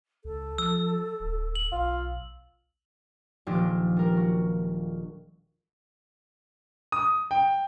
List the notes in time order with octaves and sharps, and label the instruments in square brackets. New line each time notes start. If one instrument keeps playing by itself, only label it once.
[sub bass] C#2 [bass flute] A4
[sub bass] F3 [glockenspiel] E6
[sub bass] D1
[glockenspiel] F#7
[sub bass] B1 [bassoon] F4
[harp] D#1 F3 D4 G4
G3 A#4
F#4
[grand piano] D#6
G5